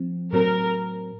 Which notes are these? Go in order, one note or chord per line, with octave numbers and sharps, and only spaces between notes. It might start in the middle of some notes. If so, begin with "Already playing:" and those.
Already playing: F3 C4
A2 F#3 C4 A#4